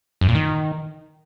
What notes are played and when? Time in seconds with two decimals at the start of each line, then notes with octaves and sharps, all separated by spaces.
0.21 F#2
0.28 A#2
0.35 D#3